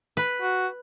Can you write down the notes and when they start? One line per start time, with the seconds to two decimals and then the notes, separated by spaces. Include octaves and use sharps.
0.17 B4
0.42 F#4